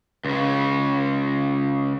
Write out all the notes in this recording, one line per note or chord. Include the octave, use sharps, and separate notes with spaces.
C#2 C#3